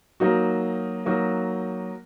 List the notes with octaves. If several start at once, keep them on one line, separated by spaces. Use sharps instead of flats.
F#3 A#3 D#4 F#4
F#3 A#3 D#4 F#4